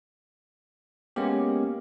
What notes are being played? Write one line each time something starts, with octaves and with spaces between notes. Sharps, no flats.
G#3 A#3 B3 C#4 G4